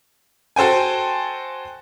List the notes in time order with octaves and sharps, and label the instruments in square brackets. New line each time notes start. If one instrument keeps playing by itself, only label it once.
[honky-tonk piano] F#4 A4 C5 G5 G#5